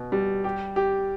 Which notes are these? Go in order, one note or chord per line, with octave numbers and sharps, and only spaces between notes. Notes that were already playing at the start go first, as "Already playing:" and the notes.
Already playing: B2
G3
G4
G4